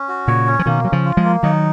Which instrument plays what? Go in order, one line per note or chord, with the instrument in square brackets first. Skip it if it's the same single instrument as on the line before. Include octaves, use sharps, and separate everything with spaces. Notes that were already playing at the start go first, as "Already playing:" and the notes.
Already playing: [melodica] C#4
F#4
[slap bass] A#2 C#3 [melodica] C#5
[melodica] C#4
[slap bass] F3
[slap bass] B2 D#3 [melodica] A#3
[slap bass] F#3 [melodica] C#4
[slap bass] C#3 F3
[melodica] F4
[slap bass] F3 G#3
[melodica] A#3
[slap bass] D#3 F#3 [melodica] D#4